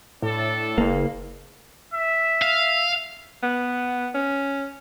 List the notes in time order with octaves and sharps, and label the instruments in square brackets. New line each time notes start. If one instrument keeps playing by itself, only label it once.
[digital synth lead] A2 [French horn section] D4 A4
[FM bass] F#1 [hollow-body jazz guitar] A#3
[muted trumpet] E5
[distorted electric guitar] F5
[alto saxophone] B3
C#4